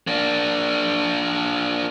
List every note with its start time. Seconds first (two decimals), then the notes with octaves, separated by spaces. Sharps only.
0.07 A#3 D4